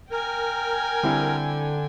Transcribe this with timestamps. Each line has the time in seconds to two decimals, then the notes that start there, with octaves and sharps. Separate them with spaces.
0.11 A#4 G5 G#5
1.03 D3 G3 C4 E4